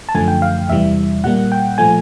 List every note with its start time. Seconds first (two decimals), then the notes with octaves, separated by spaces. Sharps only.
0.09 A5
0.14 F#2 D3 F3 A3 G#5
0.28 G5
0.42 F5
0.69 E2 C3 E3 G3 E5
1.24 A#2 G3 A#3 F#5
1.52 G5
1.78 A#2 F3 A3 G#5